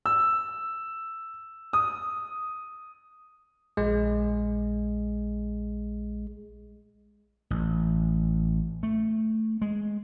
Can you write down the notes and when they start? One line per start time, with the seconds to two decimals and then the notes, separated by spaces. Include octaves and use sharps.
0.06 E6
1.73 D#6
3.77 A#1 G#3
7.51 A1
8.83 A3
9.62 G#3